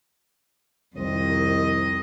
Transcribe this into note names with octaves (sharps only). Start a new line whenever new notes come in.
C2 F2 D#3 C4 D#5